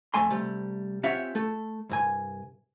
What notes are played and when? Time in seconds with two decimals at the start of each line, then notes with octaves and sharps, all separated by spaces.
0.14 F2 A3 G#5 C6
0.30 C3 G3 A3
1.03 C4 C#4 F4 G4 E5 F#5
1.35 A3 A4
1.90 C2 G2 G#5